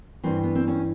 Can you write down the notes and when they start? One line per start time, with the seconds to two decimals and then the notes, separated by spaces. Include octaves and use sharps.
0.24 G2 E3 C4
0.43 B3
0.55 C4
0.68 C#4